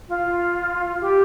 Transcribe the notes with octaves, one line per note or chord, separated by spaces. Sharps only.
F4
G4